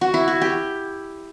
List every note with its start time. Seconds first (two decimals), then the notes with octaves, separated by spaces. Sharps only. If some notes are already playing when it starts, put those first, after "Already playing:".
0.01 F#4
0.14 E4
0.28 F#4
0.41 G4